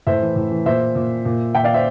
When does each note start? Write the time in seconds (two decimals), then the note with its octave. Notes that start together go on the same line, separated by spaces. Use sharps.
0.07 A2 C5 E5
0.21 E3
0.36 A2
0.51 E3
0.66 A#2 C5 E5
0.95 A#2
1.25 A#2
1.55 A#2 E5 G5
1.64 D5 F5
1.74 C5 E5